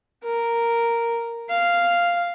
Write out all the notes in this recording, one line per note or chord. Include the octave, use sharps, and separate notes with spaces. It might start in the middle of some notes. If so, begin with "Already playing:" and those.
A#4
F5